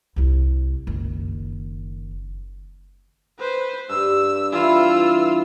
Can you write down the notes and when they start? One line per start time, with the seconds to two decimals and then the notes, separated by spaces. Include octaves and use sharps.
0.16 C2 E4
0.87 F#1 D#3
3.38 B4 C5
3.89 G2 E6
4.52 E3 E4 F4 E6